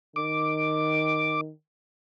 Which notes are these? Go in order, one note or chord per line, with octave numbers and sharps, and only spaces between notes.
D#3 D6